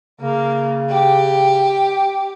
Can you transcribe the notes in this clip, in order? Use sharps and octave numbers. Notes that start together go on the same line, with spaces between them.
C#3 A#3
G4